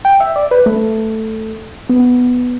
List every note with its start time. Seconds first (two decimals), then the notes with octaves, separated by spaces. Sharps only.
0.05 G5
0.20 E5
0.36 D5
0.51 B4
0.66 A3
1.89 B3